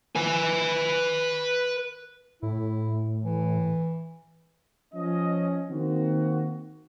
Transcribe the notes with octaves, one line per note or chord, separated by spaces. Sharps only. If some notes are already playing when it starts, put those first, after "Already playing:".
B4 G#5
A2 E4
E3
F3 C#4 D#5
D#3 A#3 C4 F#4